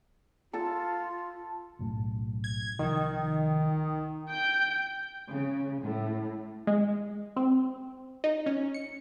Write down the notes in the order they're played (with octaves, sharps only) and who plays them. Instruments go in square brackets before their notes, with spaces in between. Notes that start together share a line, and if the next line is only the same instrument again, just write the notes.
[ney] F4 [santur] A4 A5
[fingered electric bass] B1 F#2 A2
[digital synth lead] G#6
[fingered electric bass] C2 F3 [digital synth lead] D#3
[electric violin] G5 G6
[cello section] C#3
A2
[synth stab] G#3
C4
D#4
C#4
C#7